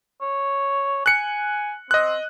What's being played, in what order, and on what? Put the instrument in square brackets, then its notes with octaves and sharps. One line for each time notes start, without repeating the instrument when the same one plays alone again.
[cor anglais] C#5
[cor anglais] G#5 [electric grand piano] F#6 C#7
[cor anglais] C4 [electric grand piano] D#5 F#6